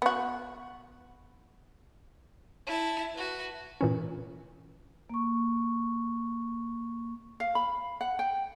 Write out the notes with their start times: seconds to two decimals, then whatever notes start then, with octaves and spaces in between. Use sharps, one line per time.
0.02 B3 F#4
2.67 E4 A5
3.14 F#4 B4
3.81 A#2 E3 C#4
5.10 A#3 C#6
7.40 F5
7.55 B5
8.01 F#5
8.19 G5